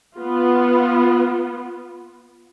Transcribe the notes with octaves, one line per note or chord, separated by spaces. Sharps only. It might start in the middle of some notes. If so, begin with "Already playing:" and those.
B3 F4